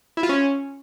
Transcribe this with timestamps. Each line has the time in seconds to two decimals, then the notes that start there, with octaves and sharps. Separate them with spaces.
0.17 E4
0.23 F4
0.29 C#4